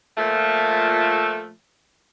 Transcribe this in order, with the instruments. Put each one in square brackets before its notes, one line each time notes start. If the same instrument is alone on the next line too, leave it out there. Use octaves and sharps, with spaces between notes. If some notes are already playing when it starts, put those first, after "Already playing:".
[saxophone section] A#2 F3 A3